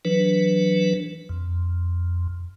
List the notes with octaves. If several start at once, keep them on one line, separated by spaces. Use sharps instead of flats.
E3 F#3 D4 B4
F2